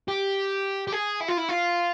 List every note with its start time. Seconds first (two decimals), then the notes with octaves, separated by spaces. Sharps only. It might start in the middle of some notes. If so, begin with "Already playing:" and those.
0.08 G4
0.87 G4
0.92 G#4
1.20 E4
1.28 F4
1.37 E4
1.49 F4